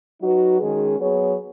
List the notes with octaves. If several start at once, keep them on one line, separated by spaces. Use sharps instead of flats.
F#3 D#4 F#4 B4
D#3 G#3 C#4 G#4
F#3 B3 G#4 C#5